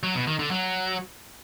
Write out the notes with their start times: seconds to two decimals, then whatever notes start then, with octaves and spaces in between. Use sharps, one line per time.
0.03 F#3
0.15 B2
0.27 D#3
0.39 D3
0.51 F#3